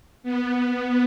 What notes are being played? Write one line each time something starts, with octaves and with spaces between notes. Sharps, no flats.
B3